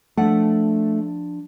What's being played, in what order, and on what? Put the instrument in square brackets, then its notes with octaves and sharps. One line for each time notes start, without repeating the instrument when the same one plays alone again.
[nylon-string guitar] F3 D4 F#5 [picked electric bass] A3